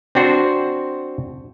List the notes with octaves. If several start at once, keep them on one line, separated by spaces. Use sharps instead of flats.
C4 D4 F#4 C5